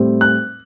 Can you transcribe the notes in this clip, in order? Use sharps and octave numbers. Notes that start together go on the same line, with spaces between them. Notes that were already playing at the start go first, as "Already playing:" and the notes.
Already playing: A2 G3 C4
F#6